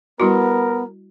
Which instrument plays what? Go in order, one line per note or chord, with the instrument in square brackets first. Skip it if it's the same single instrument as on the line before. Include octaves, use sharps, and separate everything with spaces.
[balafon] G3 E4 F#4 [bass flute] B3 [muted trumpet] A#4